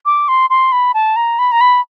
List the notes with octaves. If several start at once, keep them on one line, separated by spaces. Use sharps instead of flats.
D6
C6
C6
B5
A5
A#5
B5
A#5
B5